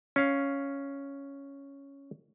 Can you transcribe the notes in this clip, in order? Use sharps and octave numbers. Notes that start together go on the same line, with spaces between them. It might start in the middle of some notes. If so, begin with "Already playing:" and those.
C#4 F5